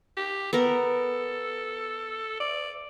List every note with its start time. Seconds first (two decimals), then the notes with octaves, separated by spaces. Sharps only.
0.17 G4
0.53 B3 A4 A#4
2.40 D5